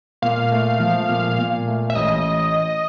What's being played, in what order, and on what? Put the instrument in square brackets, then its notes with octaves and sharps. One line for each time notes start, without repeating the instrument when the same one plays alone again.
[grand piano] A#2 [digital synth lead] F5
[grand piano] A3
F3
A#2
A#2
A3
[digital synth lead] E5
[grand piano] A1 [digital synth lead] D#5